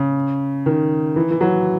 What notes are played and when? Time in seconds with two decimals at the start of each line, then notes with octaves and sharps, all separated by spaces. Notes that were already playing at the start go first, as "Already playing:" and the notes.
Already playing: C#3
0.66 D#3
1.16 E3
1.31 E3
1.41 F#3